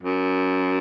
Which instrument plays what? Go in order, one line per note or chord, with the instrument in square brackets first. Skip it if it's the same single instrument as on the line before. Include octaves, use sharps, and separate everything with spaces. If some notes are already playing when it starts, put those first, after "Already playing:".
[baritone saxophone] F#2